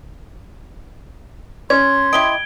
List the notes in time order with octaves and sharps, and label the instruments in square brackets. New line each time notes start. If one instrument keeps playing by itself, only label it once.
[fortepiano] C#4 [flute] C6 [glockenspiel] G#6
[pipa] E4 G4 D#5 [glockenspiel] D7 G7